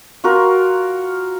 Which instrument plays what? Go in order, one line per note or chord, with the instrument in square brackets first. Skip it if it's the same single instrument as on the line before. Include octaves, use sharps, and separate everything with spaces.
[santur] F4 F#4 A#4